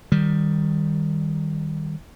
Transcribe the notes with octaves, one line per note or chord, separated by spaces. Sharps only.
D#3 G3